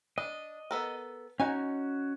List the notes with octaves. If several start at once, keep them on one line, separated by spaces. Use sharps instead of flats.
D4 D#5
B3 A4 A#4
C#4 D#4 F#4 G#5